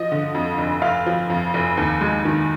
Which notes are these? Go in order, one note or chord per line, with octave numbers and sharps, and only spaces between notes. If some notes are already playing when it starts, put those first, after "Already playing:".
Already playing: F3 D#5
D3
F2
F1
F1 F5
F3
F2
F1
D#2
G#3
D#3